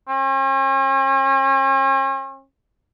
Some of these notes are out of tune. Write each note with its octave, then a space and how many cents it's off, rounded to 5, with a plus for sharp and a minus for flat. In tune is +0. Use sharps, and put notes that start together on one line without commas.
C#4 -45